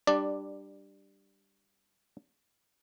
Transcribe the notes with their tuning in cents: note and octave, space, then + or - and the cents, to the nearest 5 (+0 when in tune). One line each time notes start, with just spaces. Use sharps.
G3 +0 D4 +15 D5 +0